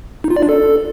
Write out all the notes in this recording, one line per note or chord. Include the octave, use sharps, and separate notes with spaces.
D#4
F4
D5
D4
A4